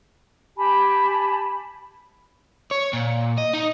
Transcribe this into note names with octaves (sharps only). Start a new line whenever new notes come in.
G4 G#5 A5 B5
C#5
A#2
D#5
D#4